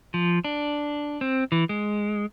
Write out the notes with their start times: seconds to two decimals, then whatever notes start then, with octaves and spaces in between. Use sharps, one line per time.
0.14 F3
0.44 D4
1.21 C4
1.52 E3
1.69 G#3